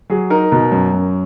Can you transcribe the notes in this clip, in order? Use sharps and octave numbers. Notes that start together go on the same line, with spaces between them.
F#3 G#4
D#4 A#4
B2 A#4
F#2
F#2